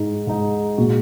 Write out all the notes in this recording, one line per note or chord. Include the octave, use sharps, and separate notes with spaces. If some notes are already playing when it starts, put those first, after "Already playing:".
Already playing: G#2 G#3 D#4
G#2 G#3 D#4
A#2 G#3 F#4